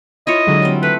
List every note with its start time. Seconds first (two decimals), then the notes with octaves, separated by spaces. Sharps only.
0.27 E4 F4 C#5 D#5
0.47 D3 F#3 G#3
0.62 G3 C4
0.83 A3 B4